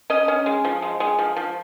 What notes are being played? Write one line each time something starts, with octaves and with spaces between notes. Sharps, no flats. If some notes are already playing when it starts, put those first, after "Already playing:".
C#4 D#5
C#4
G#3
F3
G#3
G#3
F3
F3